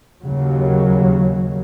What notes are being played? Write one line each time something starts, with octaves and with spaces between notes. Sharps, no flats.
D#2 C#3 F#3